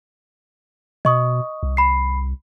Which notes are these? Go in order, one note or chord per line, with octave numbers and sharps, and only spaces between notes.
B2 D#5 C#6 D#6
C2
B5 C7